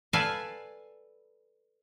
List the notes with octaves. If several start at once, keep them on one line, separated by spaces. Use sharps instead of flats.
A4 B4 D5 F5 G#5 A5